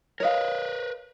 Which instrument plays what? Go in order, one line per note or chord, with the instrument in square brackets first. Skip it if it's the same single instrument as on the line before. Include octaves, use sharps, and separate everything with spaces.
[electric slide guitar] A#4 B4 [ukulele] C#5 D#5 F5